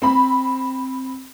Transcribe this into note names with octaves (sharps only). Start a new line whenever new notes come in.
C4 B5